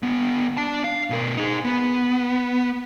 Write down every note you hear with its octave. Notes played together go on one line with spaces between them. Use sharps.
D3 B3
D4 A5
F5
B2 A#4
D#4 G#4
B3